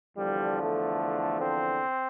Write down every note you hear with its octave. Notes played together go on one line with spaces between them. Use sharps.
E2 D3 F3 G3
A3
C4